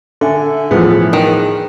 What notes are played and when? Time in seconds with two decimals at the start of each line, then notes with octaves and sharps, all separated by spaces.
0.21 D3 A4 E5 G#5
0.71 A2 E3 F3 B3 G#4
1.13 D#3